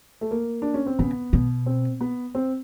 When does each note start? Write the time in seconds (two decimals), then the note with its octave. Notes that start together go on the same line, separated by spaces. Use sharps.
0.21 A3
0.31 A#3
0.62 D4
0.74 C#4
0.86 C4
0.99 C#3 B3
1.33 B2
1.66 C4
2.01 B3
2.35 C4